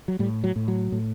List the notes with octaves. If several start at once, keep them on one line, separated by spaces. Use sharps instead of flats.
F#3
A2 G3
F#3
A2
F#3
A2